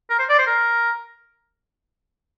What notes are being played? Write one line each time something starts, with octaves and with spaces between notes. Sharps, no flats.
A#4
C5
D5
C5
A#4